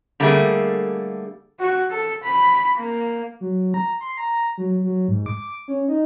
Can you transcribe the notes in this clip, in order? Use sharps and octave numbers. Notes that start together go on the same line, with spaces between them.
D3 G3 A3 A#3 G4 G#4
F#4
A4
B5
A#3
F#3
A#5
C6
A#5
F#3
F#3
G#2
D6
C#4
D#4